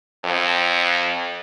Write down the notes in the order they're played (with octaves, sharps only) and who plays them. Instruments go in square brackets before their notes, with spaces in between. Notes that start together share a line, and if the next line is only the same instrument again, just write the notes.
[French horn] F2